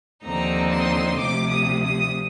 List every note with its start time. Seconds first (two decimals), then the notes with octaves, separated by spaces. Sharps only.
0.25 D#2 D3 F3 C4 D#4 A#5
0.72 C6
1.19 D2 C3 F3 D6
1.50 D#6
1.83 D#6